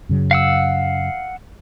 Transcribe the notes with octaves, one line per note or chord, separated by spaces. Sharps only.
F#2 C#3 F#3
F5 F#5 E6